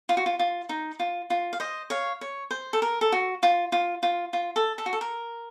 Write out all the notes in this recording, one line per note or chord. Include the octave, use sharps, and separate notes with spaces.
F4
F#4
F4
F4
D#4
F4
F4
F5
C5 D#5
C#5 F5
C#5
C5
A4
A#4
A4
F#4
F4
F4
F4
F4
A4
A4
F#4
A4
A#4